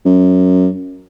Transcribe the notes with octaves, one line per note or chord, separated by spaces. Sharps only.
F#2